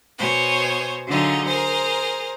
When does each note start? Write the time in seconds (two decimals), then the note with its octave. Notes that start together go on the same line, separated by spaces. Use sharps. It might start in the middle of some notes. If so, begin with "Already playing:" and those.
0.19 B2 C5 C#5 G#5
1.07 D3 F#3 D#4 F4 G#4
1.46 G#4 A#4 C5